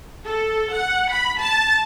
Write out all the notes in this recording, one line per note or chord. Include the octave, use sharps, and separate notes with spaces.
A4
F#5
B5
A5